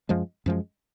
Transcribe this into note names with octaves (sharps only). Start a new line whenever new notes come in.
F#2 F3 G#3
F#2 F3 G#3